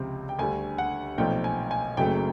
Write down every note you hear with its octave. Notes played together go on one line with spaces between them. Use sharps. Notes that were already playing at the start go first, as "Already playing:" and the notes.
Already playing: C#2 C3 F3 C4
G5
D2 D3 G3 G#5
F#5
B1 A#2 F3 A3 C4 G5
G#5
G#5
F#1 F#2 C#3 F#3 A3 G5